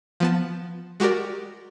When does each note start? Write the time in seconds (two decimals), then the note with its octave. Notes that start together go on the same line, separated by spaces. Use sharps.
0.20 F3 B3 A5
1.00 G#3 F#4 G4 A#4 D5